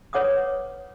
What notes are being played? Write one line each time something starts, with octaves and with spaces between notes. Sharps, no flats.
B4 C#5 F#5 D6 D#6